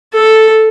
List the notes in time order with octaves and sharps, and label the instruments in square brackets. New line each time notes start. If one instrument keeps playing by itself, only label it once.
[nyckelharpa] A4